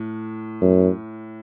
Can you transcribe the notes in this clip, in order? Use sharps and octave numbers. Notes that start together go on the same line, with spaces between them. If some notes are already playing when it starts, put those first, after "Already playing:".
Already playing: A2
F#2